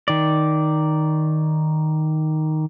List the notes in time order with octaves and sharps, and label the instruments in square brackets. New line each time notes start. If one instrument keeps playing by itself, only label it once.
[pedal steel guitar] D#3 D5